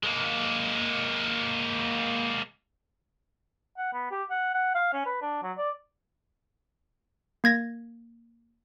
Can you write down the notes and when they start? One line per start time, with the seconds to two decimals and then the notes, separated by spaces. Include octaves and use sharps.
0.03 G#3 A#3
3.78 F#5
3.93 B3
4.11 G4
4.30 F#5
4.54 F#5
4.75 F5
4.93 C#4
5.06 B4
5.22 D4
5.43 F#3
5.58 D5
7.44 A#3 G#6 A#6